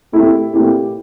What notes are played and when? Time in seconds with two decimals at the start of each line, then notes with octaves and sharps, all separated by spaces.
0.12 A#2 A3 C4 E4 G4
0.53 A#2 A3 C4 E4 G4